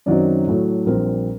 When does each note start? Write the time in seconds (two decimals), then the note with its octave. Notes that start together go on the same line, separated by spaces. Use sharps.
0.06 F#2 D#3 F#3 C4 D#4 D5
0.47 A2 F#3 A3
0.86 A#1 A#2 G3 C4 A#4